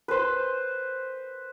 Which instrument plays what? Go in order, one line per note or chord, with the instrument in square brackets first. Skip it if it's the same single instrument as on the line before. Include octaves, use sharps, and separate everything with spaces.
[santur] B4 C5